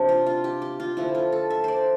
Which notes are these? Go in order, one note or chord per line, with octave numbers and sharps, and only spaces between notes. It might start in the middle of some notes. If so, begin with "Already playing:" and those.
Already playing: C3 G3 B3 C4 D4
F4
F4
G4
G4
F4
D3 F3 A3 E4
F4
A4
E5
C5 D5